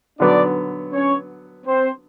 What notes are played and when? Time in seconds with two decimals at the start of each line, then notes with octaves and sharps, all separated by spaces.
0.20 D3 F#3 B3 D4 D5
0.93 C#4 C#5
1.66 C4 C5